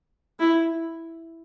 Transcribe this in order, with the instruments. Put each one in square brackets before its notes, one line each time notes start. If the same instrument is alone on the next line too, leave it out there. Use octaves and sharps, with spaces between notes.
[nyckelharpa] E4